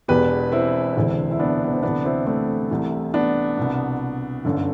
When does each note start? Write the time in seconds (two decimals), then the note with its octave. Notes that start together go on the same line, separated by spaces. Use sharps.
0.08 E1 E2 B2 G4 B4
0.52 C4 E4
0.96 E1 D2 C3 E3
1.31 E4
1.39 B3 D4
1.64 B3
1.73 C4
1.83 D2 C3 E3 B3 D4
2.05 C4 E4
2.27 A3 C4
2.70 C2 C3 E3
3.14 B3 D4
3.57 C2 B2
4.45 G1 F#2 D3